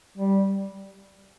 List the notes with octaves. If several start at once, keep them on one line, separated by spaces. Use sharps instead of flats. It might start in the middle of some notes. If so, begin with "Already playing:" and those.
G3